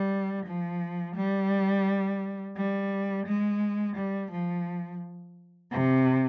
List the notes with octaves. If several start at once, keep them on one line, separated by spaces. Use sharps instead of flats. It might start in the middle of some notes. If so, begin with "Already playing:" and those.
Already playing: G3
F3
G3
G3
G#3
G3
F3
C3